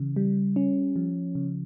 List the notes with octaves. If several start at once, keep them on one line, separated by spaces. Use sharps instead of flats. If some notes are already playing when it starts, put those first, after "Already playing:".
Already playing: C#3 E3
G3
C#4
F3
C#3